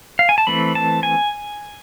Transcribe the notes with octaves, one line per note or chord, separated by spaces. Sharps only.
F5
G#5
A5
E3 A3 C4 B5
A5
G#5